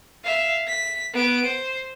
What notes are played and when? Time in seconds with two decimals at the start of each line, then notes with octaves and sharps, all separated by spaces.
0.24 E5 F5
0.67 B6
1.13 B3 D7
1.46 C5